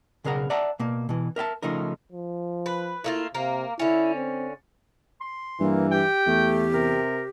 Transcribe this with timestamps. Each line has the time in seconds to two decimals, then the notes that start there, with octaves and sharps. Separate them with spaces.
0.24 B1 C#3 G#4 A#4 F#5 A#5
0.50 D5 E5 F#5 A5 A#5
0.79 B2 A#3
1.09 B2 E3
1.36 A#4 E5 G5 A5
1.63 C#3 F3 A3 D#4 A#4
2.12 F3
2.66 B4
3.04 A3 A#3 E4 F4
3.35 C3 A#3
3.79 D3 C#4 E4
4.15 C4
5.21 C6
5.60 G2 E3 A#3
5.91 G4 G5
6.27 E2 A3
6.73 C3 A#4